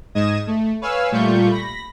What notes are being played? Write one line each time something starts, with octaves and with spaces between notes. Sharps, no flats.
G#2 D#5 D#6 G#6 E7
A3
B4 C#5 F5 G#5 E6 F6
A#2 G3 A3 F4 C#6 G6
B5 A#6